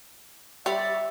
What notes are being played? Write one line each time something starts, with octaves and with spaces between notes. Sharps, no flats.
G3 C#5 D5 E5 B5